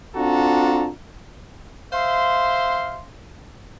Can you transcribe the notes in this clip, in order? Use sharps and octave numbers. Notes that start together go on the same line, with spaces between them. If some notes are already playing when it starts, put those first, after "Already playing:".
C4 D4 F4 F#4 A4 A#5
C5 E5 F5 C6